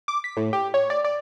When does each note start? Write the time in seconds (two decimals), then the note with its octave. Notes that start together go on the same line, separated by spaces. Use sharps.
0.08 D6
0.24 B6
0.37 A2
0.53 G4
0.74 C#5
0.90 D5
1.05 D5